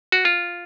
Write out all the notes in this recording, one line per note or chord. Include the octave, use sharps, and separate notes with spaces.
F#4
F4